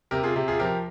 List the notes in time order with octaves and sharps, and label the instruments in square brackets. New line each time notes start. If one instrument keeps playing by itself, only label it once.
[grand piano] C3 G4 A#4
F4 G#4
C3 G4
F4 G#4
F3 G4 A#4